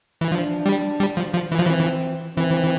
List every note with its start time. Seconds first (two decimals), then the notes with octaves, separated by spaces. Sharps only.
0.21 E3
0.31 F3 D4
0.66 G3
1.00 G3
1.17 F3
1.34 F3
1.52 E3
1.59 F3
1.67 E3 C4
2.37 E3 C4